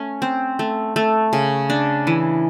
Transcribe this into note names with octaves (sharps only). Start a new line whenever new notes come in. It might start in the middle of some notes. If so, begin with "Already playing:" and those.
Already playing: A3 C#4
C4
A3
A3
C#3
D4
E3